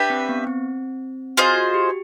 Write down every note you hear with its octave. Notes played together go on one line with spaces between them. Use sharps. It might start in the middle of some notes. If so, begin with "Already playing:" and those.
Already playing: D4 G4 B4 E5
C4
B3
C4
F4 F#4 G#4 C5 D#5
F#4
G4